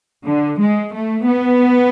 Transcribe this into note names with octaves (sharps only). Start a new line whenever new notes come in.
D3
G#3
A3
B3